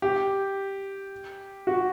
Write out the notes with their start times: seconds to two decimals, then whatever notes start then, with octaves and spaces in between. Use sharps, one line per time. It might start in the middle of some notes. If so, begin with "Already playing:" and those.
0.02 G4
1.67 F#4